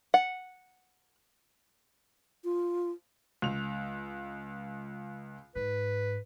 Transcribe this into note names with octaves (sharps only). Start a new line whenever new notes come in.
F#5
F4
C#2 F7
G#2 B4